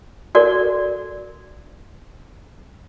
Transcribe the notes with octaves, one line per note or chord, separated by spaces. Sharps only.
F#4 A4 A#4 D5